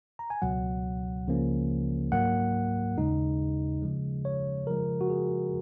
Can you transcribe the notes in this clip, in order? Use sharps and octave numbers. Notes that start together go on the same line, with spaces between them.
A#5
G#5
C#2 B2 F#3 F#5
C#2 C#3 F3 A#3 C#4
G#2 F#3 A#3 F#5
D#2 C#3 G#3 D#4
C#3 F3 G#3
C#5
C#3 F3 G#3 A#4
F#4
G#4